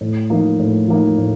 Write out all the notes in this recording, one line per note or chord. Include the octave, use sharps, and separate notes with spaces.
A2
F3 A#3 D#4
A2
F3 A#3 D#4
A2